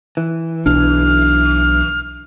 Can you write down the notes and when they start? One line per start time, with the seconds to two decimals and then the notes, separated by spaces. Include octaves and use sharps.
0.17 E3
0.66 B1 D4 F6